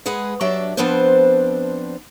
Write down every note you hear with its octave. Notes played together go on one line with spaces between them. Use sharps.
G#3 G#4 B4 F#5
F#3 D4 G4 D5 E5
F3 B3 C4 D4 B4 C5